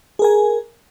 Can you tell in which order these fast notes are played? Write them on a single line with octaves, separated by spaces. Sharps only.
G#4 A#4 G#5